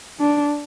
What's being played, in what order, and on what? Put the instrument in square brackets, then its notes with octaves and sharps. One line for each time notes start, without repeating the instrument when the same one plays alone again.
[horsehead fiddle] D4